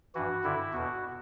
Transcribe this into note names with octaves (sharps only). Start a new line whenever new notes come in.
G2 E3 F#4
G2 D3 E4
E2 B2 F#4